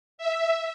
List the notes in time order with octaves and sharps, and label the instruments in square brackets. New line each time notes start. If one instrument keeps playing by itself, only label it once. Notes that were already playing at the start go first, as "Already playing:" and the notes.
[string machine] E5